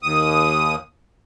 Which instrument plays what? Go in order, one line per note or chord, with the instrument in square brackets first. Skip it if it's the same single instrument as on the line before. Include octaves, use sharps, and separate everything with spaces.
[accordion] D#2 D#6